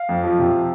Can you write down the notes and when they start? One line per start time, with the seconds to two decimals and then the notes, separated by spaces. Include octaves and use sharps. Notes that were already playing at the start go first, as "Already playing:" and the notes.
Already playing: F5
0.09 F2
0.24 F3
0.39 C3